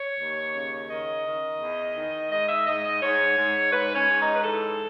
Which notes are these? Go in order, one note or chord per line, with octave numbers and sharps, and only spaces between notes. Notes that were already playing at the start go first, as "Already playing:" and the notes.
Already playing: C#5
D#2
C#3
D#3 D#5
D#3
E2
D#3
G#2 D#5
E5
G#2 D#5
D#5
G#2 C#5
G#2
G#2 B4
C#4
G#2
D#4
B4
E3 A4